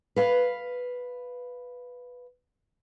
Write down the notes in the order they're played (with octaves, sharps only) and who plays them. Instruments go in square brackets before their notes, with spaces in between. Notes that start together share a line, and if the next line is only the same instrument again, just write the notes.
[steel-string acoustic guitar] B4 F5